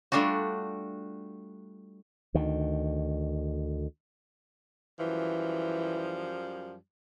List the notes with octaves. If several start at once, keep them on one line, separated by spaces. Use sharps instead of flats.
G3 A3 D4 F4 F#4
D2 D#3
F#2 E3 F3 G3